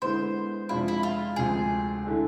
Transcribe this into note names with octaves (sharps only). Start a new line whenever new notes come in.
D3 G#3 B3 E4 C5
F2 C3 G#3 D4 E4 F4
E4
F4
D2 C3 F3 G#3 G#4
D3 A3 E4